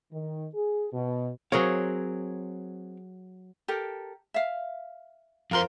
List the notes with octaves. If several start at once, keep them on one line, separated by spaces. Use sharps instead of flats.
D#3
G#4
B2
F#3 C4 G#4 A#4 C#5 F5
G4 A4 A#4
E5 F5
F2 F4 A#4 C5 C6